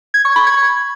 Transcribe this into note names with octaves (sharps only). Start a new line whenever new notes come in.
G#6
C#6
B5
G#6